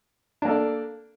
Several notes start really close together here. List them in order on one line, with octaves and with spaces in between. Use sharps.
D4 A#3 A4 D5